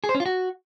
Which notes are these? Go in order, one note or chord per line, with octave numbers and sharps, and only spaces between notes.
G#4
C5
C#4
F4
F#4